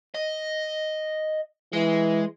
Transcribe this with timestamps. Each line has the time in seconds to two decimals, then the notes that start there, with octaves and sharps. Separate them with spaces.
0.14 D#5
1.73 E3 G#3